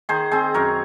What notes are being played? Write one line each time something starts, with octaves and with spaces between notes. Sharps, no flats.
D#3 G#4 C5
C4 G#4 C5
F#2 A#4 C#5